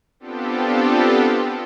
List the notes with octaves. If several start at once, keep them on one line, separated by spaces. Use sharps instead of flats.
B3 C4 D4 F4 G4 A4